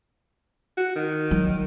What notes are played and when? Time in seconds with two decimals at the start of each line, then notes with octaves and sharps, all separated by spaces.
0.77 F#4
0.96 D#3
1.31 F#3